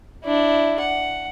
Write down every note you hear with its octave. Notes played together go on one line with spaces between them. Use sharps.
D4 E4
F#5